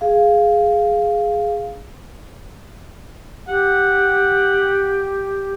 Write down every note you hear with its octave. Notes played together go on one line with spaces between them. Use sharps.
G#4 F5
G4 F#5